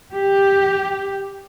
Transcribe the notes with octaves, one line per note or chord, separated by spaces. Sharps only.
G4